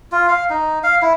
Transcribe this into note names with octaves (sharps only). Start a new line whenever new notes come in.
F4
F5
D#4
F5
E4